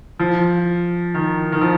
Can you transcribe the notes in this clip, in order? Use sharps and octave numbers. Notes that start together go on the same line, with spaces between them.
F3
D#3
D#3
F3